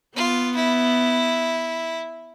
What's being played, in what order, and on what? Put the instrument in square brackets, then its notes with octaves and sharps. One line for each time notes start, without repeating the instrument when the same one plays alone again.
[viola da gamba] B3 [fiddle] F4
[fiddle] E4